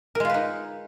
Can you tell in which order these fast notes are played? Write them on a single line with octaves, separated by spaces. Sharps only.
A#4 G#3 F4 B4 D#4